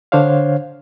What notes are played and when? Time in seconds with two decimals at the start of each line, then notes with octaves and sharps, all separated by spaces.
0.12 D3 D4 C5 C#5 F5